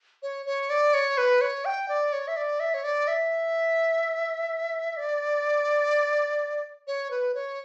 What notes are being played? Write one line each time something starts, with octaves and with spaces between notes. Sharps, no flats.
C#5
C#5
D5
C#5
B4
C#5
G5
D5
C#5
E5
D5
E5
C#5
D5
E5
D5
C#5
B4
C#5